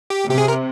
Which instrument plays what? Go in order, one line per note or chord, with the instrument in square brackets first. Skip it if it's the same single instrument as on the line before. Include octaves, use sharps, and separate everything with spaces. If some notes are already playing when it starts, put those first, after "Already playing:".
[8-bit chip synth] G4
[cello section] C3 [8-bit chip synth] G4
[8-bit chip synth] G#4
A#4